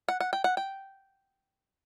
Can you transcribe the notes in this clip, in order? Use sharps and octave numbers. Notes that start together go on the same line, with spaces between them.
F#5
F#5
G5
F#5
G5